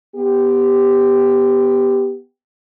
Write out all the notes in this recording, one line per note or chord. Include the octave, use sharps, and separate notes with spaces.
B3 G4